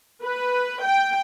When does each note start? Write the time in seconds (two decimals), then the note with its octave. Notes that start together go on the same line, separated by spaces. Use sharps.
0.23 B4
0.83 G5